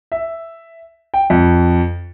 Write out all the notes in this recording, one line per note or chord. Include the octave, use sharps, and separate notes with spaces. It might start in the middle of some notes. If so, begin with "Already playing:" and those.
E5
G5
F2